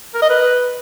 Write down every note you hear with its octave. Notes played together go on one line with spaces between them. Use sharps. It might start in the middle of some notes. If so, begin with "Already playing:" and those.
A#4
D#5
B4